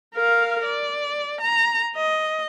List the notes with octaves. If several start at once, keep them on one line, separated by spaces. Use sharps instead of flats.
A#4 F5
D5
A#5
D#5